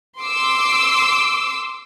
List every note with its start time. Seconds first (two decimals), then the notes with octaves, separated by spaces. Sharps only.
0.19 C6 D6 E6